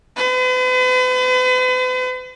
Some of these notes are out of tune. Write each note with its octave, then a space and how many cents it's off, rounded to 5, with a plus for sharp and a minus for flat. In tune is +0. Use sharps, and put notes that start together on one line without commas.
B4 +45